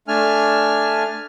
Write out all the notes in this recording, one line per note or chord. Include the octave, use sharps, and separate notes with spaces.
A3 D4 G#5 F6